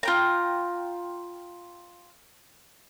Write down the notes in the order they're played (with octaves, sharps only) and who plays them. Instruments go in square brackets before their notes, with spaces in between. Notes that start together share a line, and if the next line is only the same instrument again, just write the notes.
[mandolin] F4 G5 A#5